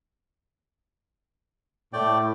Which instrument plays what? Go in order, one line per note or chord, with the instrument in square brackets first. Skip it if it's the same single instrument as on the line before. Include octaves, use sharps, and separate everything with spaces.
[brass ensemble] A2 [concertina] A3 D5 G5